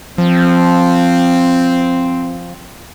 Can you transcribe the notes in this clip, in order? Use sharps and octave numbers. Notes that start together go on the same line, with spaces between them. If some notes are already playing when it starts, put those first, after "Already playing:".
F3 C4